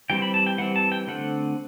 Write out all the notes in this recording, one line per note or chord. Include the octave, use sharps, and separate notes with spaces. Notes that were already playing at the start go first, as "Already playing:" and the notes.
E3 G3 C4 G5
B5
A5
G5
E3 G3 C4 F#5
A5
G5
D3 A3 C4 F#5